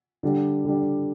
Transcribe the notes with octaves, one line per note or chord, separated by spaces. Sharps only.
D3 G3 D4
D3 G3 D4